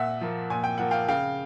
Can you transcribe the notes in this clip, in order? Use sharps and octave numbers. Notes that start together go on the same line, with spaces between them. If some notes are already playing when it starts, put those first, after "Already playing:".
Already playing: A#2 E5 F#5
F3 A#3
A#2 G#5
G5
F3 A#3 F#5
F5 G5
C#3 F5 G5